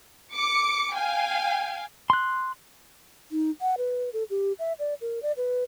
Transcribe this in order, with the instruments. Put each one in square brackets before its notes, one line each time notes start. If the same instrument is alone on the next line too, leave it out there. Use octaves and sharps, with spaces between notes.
[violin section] D6 C#7
F5 G5 G#5
[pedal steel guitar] C6 F#6
[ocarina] D#4
F#5
B4
A4
G4
E5
D5
A#4
D5
B4